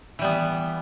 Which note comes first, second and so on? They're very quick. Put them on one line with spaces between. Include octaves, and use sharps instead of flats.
E3 G3 B3